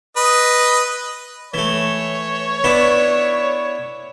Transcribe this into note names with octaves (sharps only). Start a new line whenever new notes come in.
B4 D#5
E3 A3 C#5
B3 D4 E4